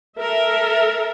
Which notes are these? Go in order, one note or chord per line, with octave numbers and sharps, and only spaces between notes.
A4 A#4 E5